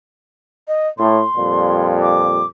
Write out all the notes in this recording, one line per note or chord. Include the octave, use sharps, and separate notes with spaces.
D#5
A2 C6
F2 A#2 G3
D6